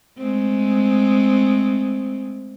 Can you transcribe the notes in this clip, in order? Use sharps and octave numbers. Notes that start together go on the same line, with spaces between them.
G#3 A3 C4